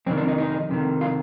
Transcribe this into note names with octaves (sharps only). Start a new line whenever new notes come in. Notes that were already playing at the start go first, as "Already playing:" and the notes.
F2 C3 D#3 C4
D4
D#4
D#4
F2 C3 D#3
F4